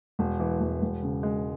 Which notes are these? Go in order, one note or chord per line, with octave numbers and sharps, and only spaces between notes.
E1
E3
E1
E1
C#3
G#3